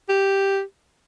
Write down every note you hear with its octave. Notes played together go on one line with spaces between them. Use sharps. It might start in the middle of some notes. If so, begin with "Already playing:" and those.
G4